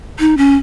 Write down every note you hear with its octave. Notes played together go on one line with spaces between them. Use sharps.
D#4
C#4